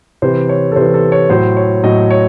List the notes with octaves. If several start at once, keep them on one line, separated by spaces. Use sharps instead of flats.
C3 E3 C5
C#5
A4
C3 E3 C5
A4
C#5
A2 F#3 C5
C#5
A2 F#3 D#5
C#5